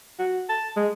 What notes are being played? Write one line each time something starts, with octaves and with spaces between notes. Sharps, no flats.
F#4
A5
G#3